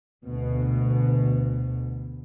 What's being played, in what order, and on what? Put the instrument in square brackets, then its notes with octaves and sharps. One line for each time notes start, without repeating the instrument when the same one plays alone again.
[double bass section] D2 B2